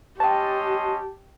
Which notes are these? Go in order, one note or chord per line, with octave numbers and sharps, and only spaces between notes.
C#4 G4 C#5 D#5 G5 A5 C6